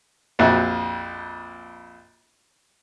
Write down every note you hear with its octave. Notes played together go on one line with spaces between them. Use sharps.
A#1 F2 F#4